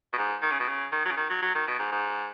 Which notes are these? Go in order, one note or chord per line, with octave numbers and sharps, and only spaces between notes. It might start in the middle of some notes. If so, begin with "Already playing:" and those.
B2
G#2
D#3
C#3
B2
C#3
D#3
F#3
C#3
D#3
F#3
F#3
D#3
B2
G#2
G#2